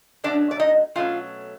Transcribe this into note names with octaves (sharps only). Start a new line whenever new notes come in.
B2 F#3 A3 C#4 D4 D5
D5
D#4 D#5
B2 F#3 A3 C#4 F4 F5